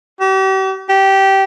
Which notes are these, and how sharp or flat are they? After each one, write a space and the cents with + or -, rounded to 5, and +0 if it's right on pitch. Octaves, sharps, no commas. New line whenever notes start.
G4 -40
G4 -15